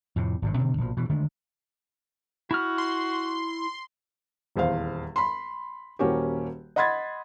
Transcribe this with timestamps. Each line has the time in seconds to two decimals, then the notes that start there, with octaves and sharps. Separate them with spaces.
0.16 F2 A2 C3
0.42 G#1 G2 C3
0.57 G2 B2 D3 D#3
0.77 A#1 B2 F3
0.97 B2 E3
1.09 D3 D#3 G#3 A3
2.51 E4 F#4 F6
2.78 C6
4.56 D#1 E2 C5 F5
5.16 B5 C6
5.99 D#1 A#3 C#4 F#4 G4
6.76 D#5 F#5 B5 C6 G#6 A6